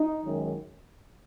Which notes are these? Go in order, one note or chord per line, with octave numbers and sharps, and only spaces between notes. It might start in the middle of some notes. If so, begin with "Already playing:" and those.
Already playing: D#4
F#2 D#3 G#3